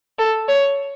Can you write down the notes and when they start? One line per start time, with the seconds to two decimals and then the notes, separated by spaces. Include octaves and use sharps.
0.19 A4
0.49 C#5